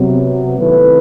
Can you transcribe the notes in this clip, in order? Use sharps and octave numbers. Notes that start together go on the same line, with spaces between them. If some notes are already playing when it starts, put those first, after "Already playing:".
Already playing: C3 F#3 B3
C3 D#3 A3 E4 B4